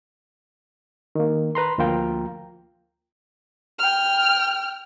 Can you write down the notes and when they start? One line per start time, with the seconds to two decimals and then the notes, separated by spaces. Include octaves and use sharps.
1.15 D#3 A#3
1.55 B4 A#5 C6
1.78 D2 F3 A#3 F4 G5 A#5
3.79 G5 F6